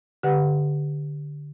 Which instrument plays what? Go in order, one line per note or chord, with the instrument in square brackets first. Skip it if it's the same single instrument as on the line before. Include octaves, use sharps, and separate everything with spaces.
[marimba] D3 G4 B4 F#5